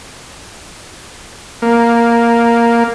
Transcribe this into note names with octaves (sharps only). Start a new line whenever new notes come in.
A#3